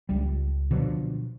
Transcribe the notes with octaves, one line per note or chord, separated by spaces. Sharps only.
C#2 G3
B2 D3 F3 F#3